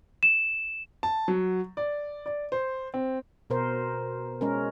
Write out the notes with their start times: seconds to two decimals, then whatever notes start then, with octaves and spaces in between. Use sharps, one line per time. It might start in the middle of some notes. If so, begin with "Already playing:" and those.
0.23 E7
1.03 A5
1.28 F#3
1.77 D5
2.26 D5
2.52 C5
2.94 C4
3.50 B2 A#4 C5
4.41 G#3 C#4 A#4